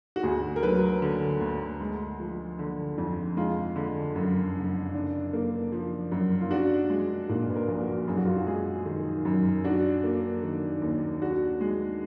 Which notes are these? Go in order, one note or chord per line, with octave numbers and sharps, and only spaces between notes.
F#4
D2 G#4
A#4
F#3 B4
D3
D2
G#3
F3
D3
F2
G#3 F4
D3
F#2
F#1
D4
A#3
F3
F#2
F4
D4 F#4
G#3
A#2
B4
A#4
A#1
F#4
F#2 G#4
F#4
F4
F#4
G#3 G#4
D#3
F#2
D4 F#4
A#3
D#3
D#2
D4 F#4
G#3